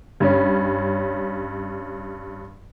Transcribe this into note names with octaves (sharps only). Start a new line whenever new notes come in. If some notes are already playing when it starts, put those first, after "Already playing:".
G2 C#4